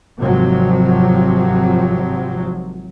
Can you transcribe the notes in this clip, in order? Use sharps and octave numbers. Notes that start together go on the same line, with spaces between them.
G#1 C3 F3 F#3